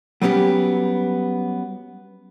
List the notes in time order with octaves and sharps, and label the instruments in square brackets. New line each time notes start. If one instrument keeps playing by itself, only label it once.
[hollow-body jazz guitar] F#3 G3 B3 C#4 G4